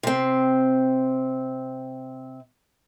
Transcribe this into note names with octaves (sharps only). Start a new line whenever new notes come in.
C3 C4